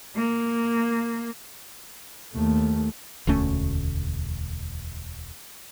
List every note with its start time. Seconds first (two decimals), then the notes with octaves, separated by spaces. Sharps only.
0.17 A#3
2.34 D#2 A3
3.27 E1 D2 A3 C#4